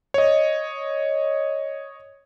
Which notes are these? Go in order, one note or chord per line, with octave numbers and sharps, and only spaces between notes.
C#5 D#5